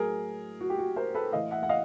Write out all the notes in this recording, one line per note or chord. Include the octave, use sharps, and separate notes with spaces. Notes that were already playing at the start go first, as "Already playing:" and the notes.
Already playing: A2 F#3 G#4 A#4
F#4
G4
F#4
A#4 C5
A4 B4
A2 E3 D#5 F5
E5 F#5
F#5
D#5 F5